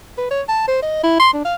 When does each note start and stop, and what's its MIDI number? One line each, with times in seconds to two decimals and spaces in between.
0.18 0.29 71
0.31 0.41 73
0.48 0.67 81
0.68 0.79 72
0.82 0.99 75
1.03 1.18 64
1.19 1.31 84
1.33 1.44 62
1.45 1.55 77